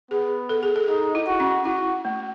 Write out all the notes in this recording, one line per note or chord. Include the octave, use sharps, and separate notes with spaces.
B3 G#4
A4
G#4
A4
D#4 G#4
E4
F#4
C#4
E4 F#4
A3